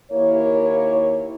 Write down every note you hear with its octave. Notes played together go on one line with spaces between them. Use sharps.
D#2 A#3 E4 C#5